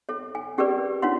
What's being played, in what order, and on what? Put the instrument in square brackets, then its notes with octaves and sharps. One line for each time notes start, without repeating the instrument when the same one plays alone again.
[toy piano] A4 C#5
G#5
C#4 G4 G#4 A#4 B4 D5
D4 F4 C#5 F#5 C6